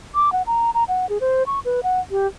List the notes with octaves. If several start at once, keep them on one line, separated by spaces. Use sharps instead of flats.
D6
F#5
A#5
A#5
F#5
G#4
C5
C#6
B4
F#5
G4